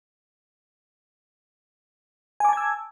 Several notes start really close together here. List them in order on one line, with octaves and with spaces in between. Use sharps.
G#5 D6 A5 G#6 E6